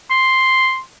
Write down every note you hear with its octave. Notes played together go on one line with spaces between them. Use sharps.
C6